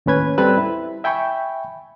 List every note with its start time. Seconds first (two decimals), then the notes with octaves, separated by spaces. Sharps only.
0.06 D#2 A2 C#4 B4 G#6
0.38 G3 C4 A4 B4 E6
0.58 E4
1.04 E5 G5 G#5 B5 C#6